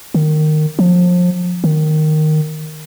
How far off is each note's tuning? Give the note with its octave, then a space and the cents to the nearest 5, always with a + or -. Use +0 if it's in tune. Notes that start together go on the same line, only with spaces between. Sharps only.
D#3 -20
F3 +30
D#3 -10